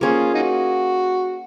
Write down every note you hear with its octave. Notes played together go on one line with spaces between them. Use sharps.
A#3 C#4 F4 G#4
D#4 F#4